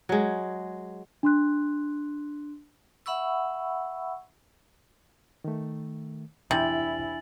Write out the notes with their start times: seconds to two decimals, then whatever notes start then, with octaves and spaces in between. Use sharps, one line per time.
0.09 F#3 G#3
1.23 D4 C6 F#6
3.06 E5 F#5 B5 C#6 E6
5.44 D#3 A3
6.51 E2 C3 D4 E4 G#5 A6 F#7